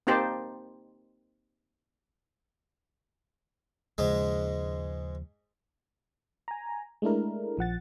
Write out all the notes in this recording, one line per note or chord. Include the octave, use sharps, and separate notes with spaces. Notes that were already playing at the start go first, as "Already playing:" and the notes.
A#3 C4 D#4 G4 C5 A5
D#2 G#2 C#3 F3 G#3
G#5 A#5
G#3 A3 D4 E4 A#4
A#1 F3 F#5 A6